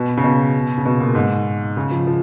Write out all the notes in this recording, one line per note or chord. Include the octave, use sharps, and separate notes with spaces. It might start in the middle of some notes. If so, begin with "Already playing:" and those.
Already playing: B2
C#3
B2
C#3
B2
A#2
G#2
C#3
F3
F3